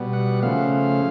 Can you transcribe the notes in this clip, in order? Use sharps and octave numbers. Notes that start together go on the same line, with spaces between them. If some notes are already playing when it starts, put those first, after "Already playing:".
Already playing: B2 G3 B3
F#5
C#3 F3 A3 F5